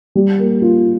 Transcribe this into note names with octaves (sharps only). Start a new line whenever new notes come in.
G3
A#3
F4